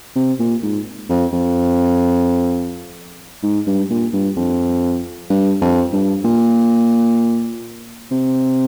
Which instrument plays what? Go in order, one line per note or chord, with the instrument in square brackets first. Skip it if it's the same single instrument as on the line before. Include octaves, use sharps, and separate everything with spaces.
[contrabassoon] C3
A#2
G#2
F2
F2
G#2
G2
A#2
G2
F2
G2
F2
G2
A#2
C3